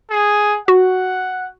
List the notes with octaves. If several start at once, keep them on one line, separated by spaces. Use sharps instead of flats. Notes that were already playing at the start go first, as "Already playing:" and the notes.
G#4
F#4 F#5